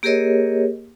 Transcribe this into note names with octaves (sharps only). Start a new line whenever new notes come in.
A#3 G4 G#4 A#4 C#5 D#5